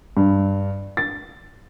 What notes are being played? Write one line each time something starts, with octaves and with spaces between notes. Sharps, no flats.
G2
A6